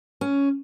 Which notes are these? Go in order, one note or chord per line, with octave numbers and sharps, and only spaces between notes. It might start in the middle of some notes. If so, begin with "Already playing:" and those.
C#4